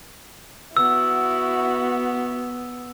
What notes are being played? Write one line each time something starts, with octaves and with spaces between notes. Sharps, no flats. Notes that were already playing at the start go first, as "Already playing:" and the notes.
B3 E4 F#4 E6